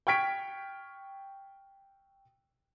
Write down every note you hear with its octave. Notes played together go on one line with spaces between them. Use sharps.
G5 C#6 F6 G#6 B6 D7